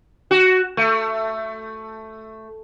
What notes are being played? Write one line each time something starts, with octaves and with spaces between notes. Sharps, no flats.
F#4
A3